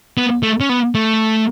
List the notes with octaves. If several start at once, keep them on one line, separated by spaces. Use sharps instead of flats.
B3
A3
C#4
B3
A3